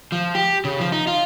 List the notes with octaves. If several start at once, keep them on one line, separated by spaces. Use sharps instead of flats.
F3
G4
C#3
F3
D#4
F4